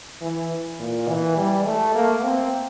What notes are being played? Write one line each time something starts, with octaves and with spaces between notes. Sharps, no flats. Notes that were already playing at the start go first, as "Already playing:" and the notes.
E3
A#2
E3
G3
A3
A#3
C4